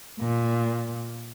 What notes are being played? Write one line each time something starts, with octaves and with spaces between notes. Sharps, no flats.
A#2